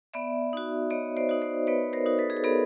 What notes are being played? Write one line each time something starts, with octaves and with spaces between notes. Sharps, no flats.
B3 D5 E5
D#4 F#4
B3 C#5 D#5
C5 D5
D#4 F#4
C5 D5
B3 B4 C#5
A#4 C5
D#4 F#4
A4 B4
G#4
A4
B3 G#4 A#4